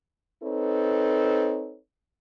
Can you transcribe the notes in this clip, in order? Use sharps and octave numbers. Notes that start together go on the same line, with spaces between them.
C4 D#4 A4 B4 C#5